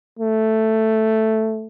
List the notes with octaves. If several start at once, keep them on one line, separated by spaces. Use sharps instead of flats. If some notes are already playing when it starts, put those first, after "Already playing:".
A3